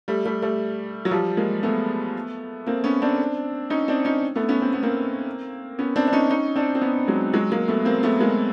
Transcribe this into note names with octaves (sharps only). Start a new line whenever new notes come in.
G3 A3
G3 A3
G3 A3
F#3
F3 G3
G#3 A#3
A3 B3
A#3 C4
B3 C#4
C4 D4
C#4 D#4
C4 D4
C#4 D#4
A3 B3
B3 C#4
C4
B3
A#3 C4
B3 C#4
C4 D4
D4
C#4 D#4
C#4 D#4
C4 D4
C4
B3 C#4
F#3 G#3
F#3 G#3
G#3 A#3
A3 B3
A#3 C4
A3 B3
G#3 A#3